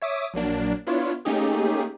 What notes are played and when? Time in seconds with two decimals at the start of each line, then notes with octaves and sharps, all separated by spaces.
0.02 C#5 E5 D6 D#6
0.34 A#1 F#3 A#3 D4
0.87 B3 D4 E4 F4 C#5
1.25 A3 A#3 C#4 D#4 G4 G#4